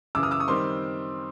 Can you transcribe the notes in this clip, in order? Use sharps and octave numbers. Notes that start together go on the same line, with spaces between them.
F#2 C#3 E3 D6 E6
D#6 F6
D6 E6
C#6 D#6
D#3 G3 C4 D#4 C6 D6